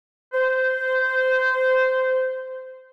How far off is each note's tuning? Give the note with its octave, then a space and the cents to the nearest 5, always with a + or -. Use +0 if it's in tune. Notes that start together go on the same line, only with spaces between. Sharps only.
C5 -15